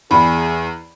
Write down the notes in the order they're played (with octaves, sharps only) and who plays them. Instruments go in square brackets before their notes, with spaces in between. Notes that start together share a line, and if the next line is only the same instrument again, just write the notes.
[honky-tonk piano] E2 [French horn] G#4 [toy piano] D5 G5 B5